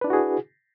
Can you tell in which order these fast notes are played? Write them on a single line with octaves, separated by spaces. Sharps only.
B4 D4 E4 F#4 G#4